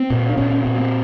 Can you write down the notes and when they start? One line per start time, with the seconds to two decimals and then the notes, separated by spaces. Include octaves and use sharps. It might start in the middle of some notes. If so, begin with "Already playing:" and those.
Already playing: C4
0.10 A#2
0.29 D4
0.37 A#2 C#4
0.50 C#4
0.64 A#2 C4
0.78 C4